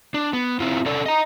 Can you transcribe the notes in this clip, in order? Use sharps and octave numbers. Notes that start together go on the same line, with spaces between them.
D4
B3
C4 E4 F4
C#4 D4 A4 D5
D#5 A#5